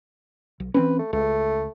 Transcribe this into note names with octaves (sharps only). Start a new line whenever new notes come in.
B1
E3 C4 C#4 B4
A3
C#2 A3